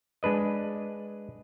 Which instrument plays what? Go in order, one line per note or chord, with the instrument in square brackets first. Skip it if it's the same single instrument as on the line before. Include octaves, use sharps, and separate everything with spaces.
[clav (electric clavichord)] G#3 D4 B4 D#5